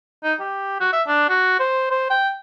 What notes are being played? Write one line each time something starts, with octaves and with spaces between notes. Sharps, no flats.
D#4
G4
F#4
E5
D4
F#4
C5
C5
G5